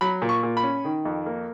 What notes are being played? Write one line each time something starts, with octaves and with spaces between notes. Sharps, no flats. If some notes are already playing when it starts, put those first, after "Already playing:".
F#3 B5
A#2
C#6
A#2
B5
C#4
D#3
F2
A#3